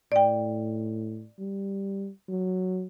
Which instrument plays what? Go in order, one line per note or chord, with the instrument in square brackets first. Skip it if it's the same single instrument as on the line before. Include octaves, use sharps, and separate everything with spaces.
[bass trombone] A2 [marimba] D5 G5
[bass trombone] G3
F#3